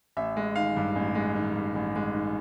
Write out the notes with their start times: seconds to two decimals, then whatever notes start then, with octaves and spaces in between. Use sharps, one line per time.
0.17 A1 E5
0.37 G#3
0.56 D#3 F5
0.77 G2
0.96 A1
1.15 G#3
1.36 D#3
1.56 G2
1.76 A1
1.96 G#3
2.14 D#3